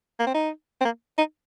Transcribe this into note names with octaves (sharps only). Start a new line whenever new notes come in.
A#3
C4
D#4
C4
A#3
D#4